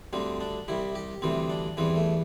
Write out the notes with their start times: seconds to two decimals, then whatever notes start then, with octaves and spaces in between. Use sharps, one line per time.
0.13 D2 D3 G3 C4
0.41 D4
0.68 C2 C3 G3 E4
0.95 G4
1.22 D2 C3 E3 G3 C4
1.50 D4
1.77 E2 E3 G3 C4
1.96 A3